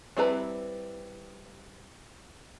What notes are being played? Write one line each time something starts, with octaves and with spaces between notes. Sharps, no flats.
G3 C4 E4 B4 A#5